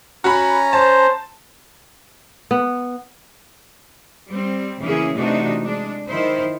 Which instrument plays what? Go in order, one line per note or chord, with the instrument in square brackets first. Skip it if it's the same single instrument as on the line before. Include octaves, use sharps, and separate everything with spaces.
[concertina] C#4 A#5 [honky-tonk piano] F#4 B5
[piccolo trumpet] C5 [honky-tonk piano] A5
[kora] B3
[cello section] G3 C4
C#3 E3 A#3 C#4 E4 G#4
C3 E3 A3 D4 D#4 F#4
G#3 D4
D#3 E4 C5